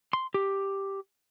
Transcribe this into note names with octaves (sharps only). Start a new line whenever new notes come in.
C6
G4